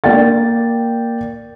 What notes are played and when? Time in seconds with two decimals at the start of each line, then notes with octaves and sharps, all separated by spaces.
0.04 A#3 D5 G5 A6